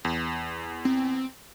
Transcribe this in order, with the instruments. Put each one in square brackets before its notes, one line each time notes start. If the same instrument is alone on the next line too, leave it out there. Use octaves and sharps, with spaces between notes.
[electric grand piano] E2
[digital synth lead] C4